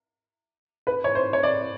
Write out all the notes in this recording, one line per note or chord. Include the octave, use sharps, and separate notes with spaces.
B4
C#5
C5
C#5
D5